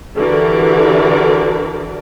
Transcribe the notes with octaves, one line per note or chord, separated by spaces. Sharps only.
D3 E3 F#4 G4 A#4 D5